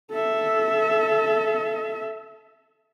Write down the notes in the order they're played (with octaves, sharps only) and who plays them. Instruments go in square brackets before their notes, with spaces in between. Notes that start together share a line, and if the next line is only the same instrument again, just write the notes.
[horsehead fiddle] A4 E5